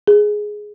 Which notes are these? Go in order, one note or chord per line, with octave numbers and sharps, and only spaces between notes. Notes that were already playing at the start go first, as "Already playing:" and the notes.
G#4